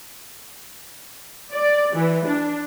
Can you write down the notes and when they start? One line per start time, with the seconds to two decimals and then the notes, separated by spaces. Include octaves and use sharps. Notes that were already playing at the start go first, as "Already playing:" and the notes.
1.52 D5
1.93 E3
2.25 D4